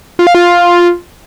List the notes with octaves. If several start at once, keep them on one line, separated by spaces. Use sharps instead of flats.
F4
F5
F4